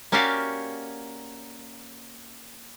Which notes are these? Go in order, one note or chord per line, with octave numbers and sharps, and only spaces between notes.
A#3 C#4 F#4 G4 D5 F5